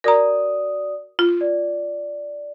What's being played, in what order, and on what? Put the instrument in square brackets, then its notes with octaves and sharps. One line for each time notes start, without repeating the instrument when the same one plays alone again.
[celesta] F#4 D5 D#6 [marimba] A#4 A#5
[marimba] F4
[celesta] D5